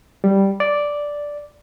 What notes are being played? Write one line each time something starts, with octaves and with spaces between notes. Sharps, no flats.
G3
D5